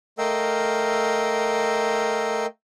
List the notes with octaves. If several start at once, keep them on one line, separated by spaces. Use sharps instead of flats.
A3 A#4 D#5 F5 G5 E6